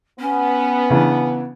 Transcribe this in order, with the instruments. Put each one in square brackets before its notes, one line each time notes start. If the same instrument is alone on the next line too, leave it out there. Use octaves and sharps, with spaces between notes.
[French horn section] B3 [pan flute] C#4
[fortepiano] C#3 E3 D4